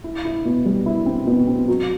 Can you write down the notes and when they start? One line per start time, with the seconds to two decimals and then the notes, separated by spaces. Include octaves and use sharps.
0.04 E4
0.25 E4
0.45 B2
0.66 G3
0.86 E4
1.06 C4
1.27 B2
1.47 C4
1.68 F#3